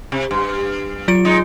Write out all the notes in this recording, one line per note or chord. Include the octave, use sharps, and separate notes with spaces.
C3
G2
F#3 F4 D7
G#3 D#4